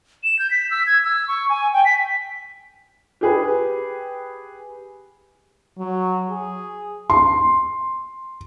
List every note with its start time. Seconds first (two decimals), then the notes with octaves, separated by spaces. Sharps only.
0.24 E7
0.39 G6
0.51 B6
0.71 E6
0.87 G#6
1.04 E6
1.28 C#6
1.50 G#5
1.73 G5
1.85 B6
3.21 G4 G#4 B4
5.79 F#3
6.30 G#4
7.10 C6